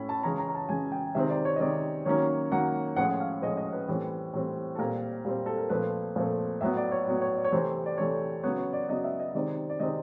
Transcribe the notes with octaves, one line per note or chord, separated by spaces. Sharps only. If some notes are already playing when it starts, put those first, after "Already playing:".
Already playing: A2 C#4 B5
A5
C#3 E3 G#3 C#4 A#5
A#5
A#5
A5
C#3 E3 G#3 C#4 G#5
G5
C3 D#3 G#3 C4 E5
D5
C#5
D#5
C3 D#3 G#3 C4 D5
D#3 F#3 A#3 C#4 C#5
D#3 F#3 A#3 C#4 F#5
A2 F3 G#3 C#4 F#5
F5
A2 F3 G#3 C#4 D#5
D#5
B4
A2 E3 G3 C4
A2 E3 G3 C4
A4
A#2 G3 C4 A#4
A#2 G3 C4
A4
A#4
A#2 F3 A3 C4 B4
A#2 F3 A3 C4
A2 F#3 B3 E5
D5
C#5
A2 F#3 B3
C#5
D5
C#5
C3 E3 A3 C4 C5
D5
C3 E3 A3 C4 C#5
C#3 F#3 B3 C#5
C#5
D5
C#3 F#3 B3 D#5
E5
D#5
C3 D#3 G#3 C4 D5
D5
C3 D#3 G#3 C4 D#5